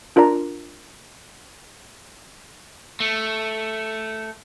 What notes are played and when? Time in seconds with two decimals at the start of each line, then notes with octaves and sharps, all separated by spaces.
0.16 D4 F4 A#4 D5 A#5
3.00 A3